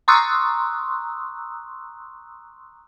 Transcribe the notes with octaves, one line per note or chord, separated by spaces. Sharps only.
A#5 C6 C#6 D#6 E6 F#6